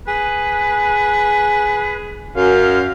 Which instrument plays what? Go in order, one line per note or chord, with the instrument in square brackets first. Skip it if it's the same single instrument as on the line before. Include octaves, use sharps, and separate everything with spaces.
[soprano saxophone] G#4 [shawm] B4
[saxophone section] F#2 [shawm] F5